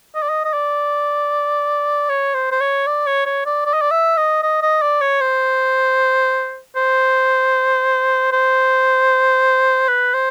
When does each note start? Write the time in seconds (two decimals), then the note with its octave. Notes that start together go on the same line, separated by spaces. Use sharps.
0.15 D#5
0.23 D5
0.29 D#5
0.45 D#5
0.53 D5
2.09 C#5
2.34 C5
2.52 C5
2.61 C#5
2.87 D5
3.06 C#5
3.26 C#5
3.46 D5
3.65 D5
3.73 D#5
3.82 D5
3.91 E5
4.17 D#5
4.43 D#5
4.62 D#5
4.82 D5
5.01 C#5
5.21 C5
6.76 C5
8.32 C5
9.88 B4
10.14 C5